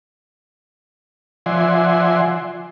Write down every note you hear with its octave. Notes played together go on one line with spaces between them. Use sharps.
F3 D5 E5 F#5 G#5 C6